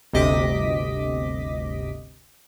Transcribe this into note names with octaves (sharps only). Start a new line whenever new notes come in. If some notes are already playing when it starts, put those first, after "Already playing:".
G1 D2 C3 D#5 D6 B6